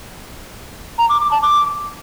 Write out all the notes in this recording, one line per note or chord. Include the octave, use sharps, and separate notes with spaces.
A#5
D6
D6
A5
D6